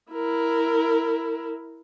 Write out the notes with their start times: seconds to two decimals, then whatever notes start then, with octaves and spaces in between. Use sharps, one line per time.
0.12 E4 A#4